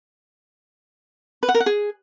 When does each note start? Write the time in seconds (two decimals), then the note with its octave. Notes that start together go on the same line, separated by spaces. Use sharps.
1.43 B4
1.49 F#5
1.54 A#4
1.60 F#5
1.66 G#4